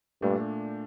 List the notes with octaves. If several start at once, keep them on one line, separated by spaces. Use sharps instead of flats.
G2 A#2 A3 D4